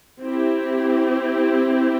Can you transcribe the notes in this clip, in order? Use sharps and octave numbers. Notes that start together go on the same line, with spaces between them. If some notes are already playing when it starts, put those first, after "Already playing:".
C4 E4 G4